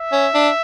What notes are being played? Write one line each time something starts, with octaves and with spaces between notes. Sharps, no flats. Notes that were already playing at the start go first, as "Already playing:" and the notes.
Already playing: E5
C#4
D4